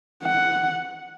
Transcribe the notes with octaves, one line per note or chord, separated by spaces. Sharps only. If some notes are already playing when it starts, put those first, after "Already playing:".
F#5